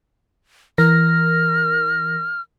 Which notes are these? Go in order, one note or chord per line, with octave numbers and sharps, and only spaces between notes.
E3 A#4 F6 A#6